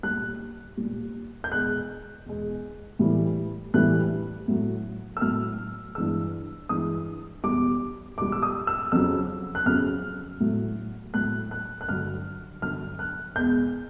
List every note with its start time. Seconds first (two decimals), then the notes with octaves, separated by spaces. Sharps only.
0.03 A#2 G3 F#6
0.77 A#2 G3
1.44 G6
1.51 E2 B2 G#3 F#6
2.26 E2 B2 G#3
2.99 A2 E3 G3
3.74 A2 E3 G3 F#6
4.48 A2 F#3
5.17 E6
5.21 A2 F#3 F6
5.95 G2 E3 G#3 E6
6.69 G2 E3 G#3 D#6
7.44 E2 B2 G3 D6
8.18 E2 B2 G3 D6
8.32 E6
8.42 D#6
8.67 E6
8.92 F2 C#3 F#3 E6
9.55 F#6
9.66 F2 C#3 F#3 F6
10.40 A2 F#3
11.14 A2 F#3 F#6
11.51 F#6
11.81 F#6
11.89 G2 D3 F#3 F6
12.62 G2 D3 F#3 F6
12.99 F#6
13.36 E2 B2 G#3 G6